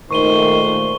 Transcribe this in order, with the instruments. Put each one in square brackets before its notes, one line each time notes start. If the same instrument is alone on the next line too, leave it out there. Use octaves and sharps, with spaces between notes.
[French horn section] A#2 G#3 A3 [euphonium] D#3 [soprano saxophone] C5 [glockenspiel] C#6 D#7 G7